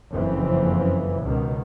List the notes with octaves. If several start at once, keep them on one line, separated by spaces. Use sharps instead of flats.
F#1 F2 E3 C4
C#2 B2 D#3